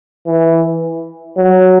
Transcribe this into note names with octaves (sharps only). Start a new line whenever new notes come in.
E3
F#3